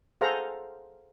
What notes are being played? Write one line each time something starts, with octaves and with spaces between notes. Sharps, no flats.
G#4 A4 C5 F5 F#5 A#5